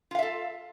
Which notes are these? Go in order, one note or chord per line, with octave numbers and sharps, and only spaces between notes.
F4 A4 E5 F5